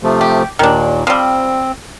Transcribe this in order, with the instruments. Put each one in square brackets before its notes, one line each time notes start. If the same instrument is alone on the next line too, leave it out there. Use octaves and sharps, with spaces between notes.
[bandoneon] C3 F3 A3
[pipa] G4
[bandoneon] D#2 A#2 [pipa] D#3 D4
[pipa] F3 G3 [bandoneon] C4